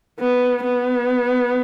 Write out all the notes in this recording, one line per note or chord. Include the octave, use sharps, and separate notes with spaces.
B3
B3